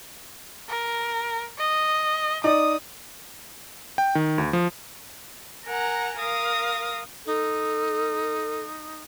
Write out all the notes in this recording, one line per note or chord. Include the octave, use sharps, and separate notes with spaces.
A#4
D#5
D#4 D5 D#6
G5
D#3
D2
F3
A#4 F#5 G#5 A#5
A#4 F5 D#6
D#4 A4